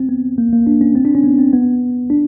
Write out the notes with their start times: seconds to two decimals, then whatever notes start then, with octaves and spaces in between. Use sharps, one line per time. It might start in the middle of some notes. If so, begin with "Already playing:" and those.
Already playing: C4
0.09 B3
0.38 A#3
0.52 A#3
0.67 D4
0.81 C#4
0.96 C4
1.05 D4
1.15 C#4
1.24 B3
1.38 C4
1.53 B3
2.10 D4